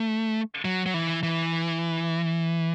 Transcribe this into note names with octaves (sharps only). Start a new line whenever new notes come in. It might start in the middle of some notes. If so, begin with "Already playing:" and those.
Already playing: A3
F#3
F#3
E3
E3